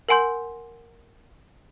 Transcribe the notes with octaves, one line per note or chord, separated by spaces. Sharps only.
A#4 F#5 G#5 C6 G6